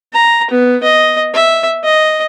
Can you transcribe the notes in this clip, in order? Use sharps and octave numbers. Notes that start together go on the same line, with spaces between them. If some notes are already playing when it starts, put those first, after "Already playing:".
A#5
B3
D#5
E5
D#5